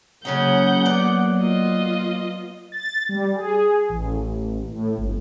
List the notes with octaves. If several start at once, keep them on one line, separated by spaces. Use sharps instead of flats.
C#3 F#3 A#3 C#4 D#4 F#5 G6
B3 D5
F4 D#5
A6
G3
G#4
A1
A2
G1